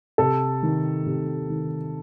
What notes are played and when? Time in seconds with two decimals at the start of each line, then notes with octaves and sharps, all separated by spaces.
0.18 C3 A4
0.63 D#3
1.06 C3
1.50 D#3